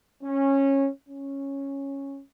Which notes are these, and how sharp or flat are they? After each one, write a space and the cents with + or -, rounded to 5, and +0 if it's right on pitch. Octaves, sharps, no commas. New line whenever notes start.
C#4 -15
C#4 -10